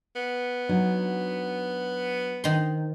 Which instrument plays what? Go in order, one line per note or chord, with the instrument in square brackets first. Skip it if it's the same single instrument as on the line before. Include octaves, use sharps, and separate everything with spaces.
[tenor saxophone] B3
[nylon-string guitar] F#3 D4 D#4
[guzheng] D#3 C6 [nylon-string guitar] C5 D#5